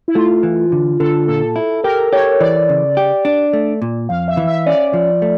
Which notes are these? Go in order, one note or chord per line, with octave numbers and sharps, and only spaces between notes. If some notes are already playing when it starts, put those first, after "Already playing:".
E4
A3 F4
E3
D3
D3 A4
A#2 A4
E4
G4 A#4
G4 C#5
E3 D5
C#3
G4
D4
A3
A#2
F2 F5
E5
E3
E5
C#4 D5
F3
A3